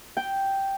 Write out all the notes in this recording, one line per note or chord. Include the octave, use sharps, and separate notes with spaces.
G5